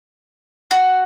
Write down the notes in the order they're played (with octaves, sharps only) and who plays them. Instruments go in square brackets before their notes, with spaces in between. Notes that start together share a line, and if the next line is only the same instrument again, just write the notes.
[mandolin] F#4